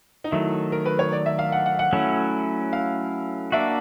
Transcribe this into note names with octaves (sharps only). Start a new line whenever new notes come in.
D#4
D#3 F#3 A3 E4
A#4
B4
C#5
D5
E5
F5
F#5
F#5
F#5
F#3 A3 C#4 E4
F5
A#3 D4 F#4 E5